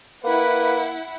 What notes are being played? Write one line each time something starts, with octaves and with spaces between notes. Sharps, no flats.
A#3 E4 B4 F#5